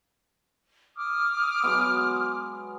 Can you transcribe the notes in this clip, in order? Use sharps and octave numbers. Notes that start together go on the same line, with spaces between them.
D6 D#6 F6
F#3 G#3 B3